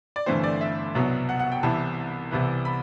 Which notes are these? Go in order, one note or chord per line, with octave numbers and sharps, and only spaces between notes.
D5
G1 G2 E3 A3 C4 C5
D5
E5
C2 B2 F#3 B3
F#5
F#5
G5
C2 C3 E3 B3 E4 A5
C2 C3 E3 B3
B5